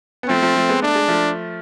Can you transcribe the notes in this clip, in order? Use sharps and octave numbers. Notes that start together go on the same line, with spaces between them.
B3
F3 A3 C4
F3 A3
F3 A3
G#3 B3
A3 D4
G#3
F3 A3